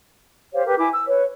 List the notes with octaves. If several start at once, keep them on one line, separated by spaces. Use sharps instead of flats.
G4 C5 C#5 F5
G4 A#4 B4
E4 G#5 D6
E6
B4 C#5